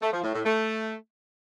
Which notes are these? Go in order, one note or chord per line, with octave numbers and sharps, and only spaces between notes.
A3
F3
A2
A2
A3